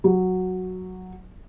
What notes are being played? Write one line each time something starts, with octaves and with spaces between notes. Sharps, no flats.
F#3